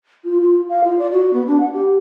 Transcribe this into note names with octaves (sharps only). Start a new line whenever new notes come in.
F4
F4
F5
F4
D5
F#4
B3
D4
F#5
G4